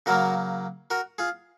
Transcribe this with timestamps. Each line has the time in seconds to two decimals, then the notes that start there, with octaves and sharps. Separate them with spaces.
0.06 C#3 F#3 A#3 F#4 A#4
0.90 F#4 A#4
1.18 F4 G#4